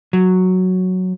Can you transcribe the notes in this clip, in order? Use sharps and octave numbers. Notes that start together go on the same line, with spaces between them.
F#3